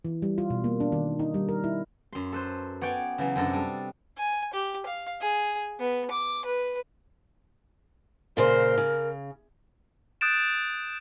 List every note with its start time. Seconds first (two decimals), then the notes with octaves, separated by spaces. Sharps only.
0.05 E3
0.22 G3
0.38 F4
0.50 B2
0.64 A#3
0.80 D4
0.92 D#3
1.19 D#4
1.34 G3
1.49 A#4
1.64 E4
2.13 F#2 C6
2.32 A4 B4 C5
2.81 B3 C#5 D5 G5 G#5
3.18 C#3 E3 F#3
3.36 F#2 C3 D4 A4 D#5
3.53 G3 A4
4.18 G#5
4.54 G4
4.86 F5
5.21 G#4
5.79 B3
6.11 D6
6.45 B4
8.37 A#2 C#3 A#4 C5
8.78 C#3
10.21 D#6 F#6 G6 A6 D7 E7